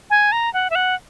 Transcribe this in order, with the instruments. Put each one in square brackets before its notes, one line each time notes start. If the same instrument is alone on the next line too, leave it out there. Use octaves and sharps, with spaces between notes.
[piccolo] G#5
A#5
F#5
E5
F#5